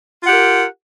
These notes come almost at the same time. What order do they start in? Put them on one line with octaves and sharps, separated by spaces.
F4 F#5 G4 A#4